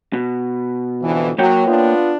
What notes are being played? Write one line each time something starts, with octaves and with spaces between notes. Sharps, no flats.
B2
F2 D3 E3
F#3 A#3 C#5 G5
B3 D4 F4